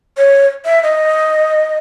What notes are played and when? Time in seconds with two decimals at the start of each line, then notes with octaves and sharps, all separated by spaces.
0.17 C#5
0.65 E5
0.83 D#5